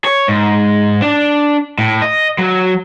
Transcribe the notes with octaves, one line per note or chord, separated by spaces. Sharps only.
C#5
G#2
D4
A2
D#5
F#3